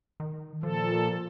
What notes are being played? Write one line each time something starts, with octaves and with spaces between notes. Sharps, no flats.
D#3
A#2 F3 A4